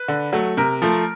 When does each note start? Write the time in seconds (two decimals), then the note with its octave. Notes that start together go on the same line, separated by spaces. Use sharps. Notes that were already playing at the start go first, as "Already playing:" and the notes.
Already playing: B4
0.08 D3
0.33 F#3 A3
0.57 C3 A#4
0.82 F3 A3